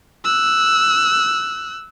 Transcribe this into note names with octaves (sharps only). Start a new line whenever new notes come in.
E6 F#6